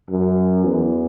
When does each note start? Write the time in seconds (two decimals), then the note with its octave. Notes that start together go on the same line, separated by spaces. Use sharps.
0.09 F#2
0.64 E2